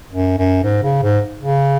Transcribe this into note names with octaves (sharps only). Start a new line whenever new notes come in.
F#2
F#2
G#2
C#3
G#2
C#3